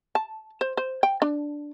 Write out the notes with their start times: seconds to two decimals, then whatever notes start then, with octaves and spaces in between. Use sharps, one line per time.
0.15 A5
0.61 C5
0.77 C5
1.03 G5
1.22 D4